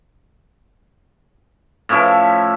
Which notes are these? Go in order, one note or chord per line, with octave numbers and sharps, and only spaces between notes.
A2 F3 C#4 E4